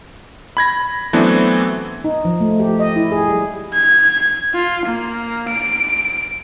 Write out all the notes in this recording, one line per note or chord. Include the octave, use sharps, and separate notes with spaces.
B5 G#6 A#6
E3 F#3 A3 B3 C4 D4
D#4
F3
A3
G4
D#5
E4
G#4
G3
G#6
F4
A#3
D7